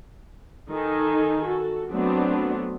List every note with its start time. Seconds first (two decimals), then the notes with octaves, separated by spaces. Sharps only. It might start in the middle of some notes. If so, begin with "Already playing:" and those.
0.71 D#3 D#4 A4 G#5
1.43 F#4 A4
1.90 F#3 A3 B3 C4 D4